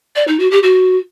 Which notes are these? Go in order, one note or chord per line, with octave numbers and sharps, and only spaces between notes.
D5
D#4
F#4
G4
F#4